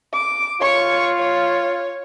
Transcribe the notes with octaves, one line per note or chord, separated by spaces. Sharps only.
D6
F4 C#5 C#6
C#5